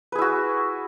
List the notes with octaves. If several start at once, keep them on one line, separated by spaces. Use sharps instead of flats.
E4 F#4 G#4 B4